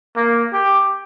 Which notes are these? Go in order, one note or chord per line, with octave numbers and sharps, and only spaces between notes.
A#3
G4